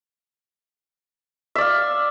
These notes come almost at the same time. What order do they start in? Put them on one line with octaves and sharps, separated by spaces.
E5 D5 F5